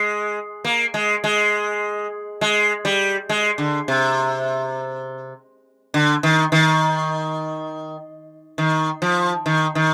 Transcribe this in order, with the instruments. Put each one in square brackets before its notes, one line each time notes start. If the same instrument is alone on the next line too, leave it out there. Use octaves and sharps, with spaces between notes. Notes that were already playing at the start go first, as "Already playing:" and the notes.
Already playing: [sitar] G#3
A#3
G#3
G#3
G#3
G3
G#3
D3
C3
D3
D#3
D#3
D#3
F3
D#3
D#3